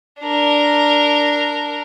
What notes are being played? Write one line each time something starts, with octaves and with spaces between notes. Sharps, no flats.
D4 A#4